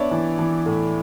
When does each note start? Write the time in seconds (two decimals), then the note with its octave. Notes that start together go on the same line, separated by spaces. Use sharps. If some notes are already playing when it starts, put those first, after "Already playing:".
Already playing: B3 D4 C#5 D5 E5
0.11 E3
0.39 E3
0.66 A2